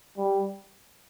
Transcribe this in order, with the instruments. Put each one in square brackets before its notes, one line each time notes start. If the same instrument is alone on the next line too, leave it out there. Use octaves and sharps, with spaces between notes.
[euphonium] G3